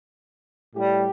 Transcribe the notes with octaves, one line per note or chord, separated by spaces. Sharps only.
A2 G3 G4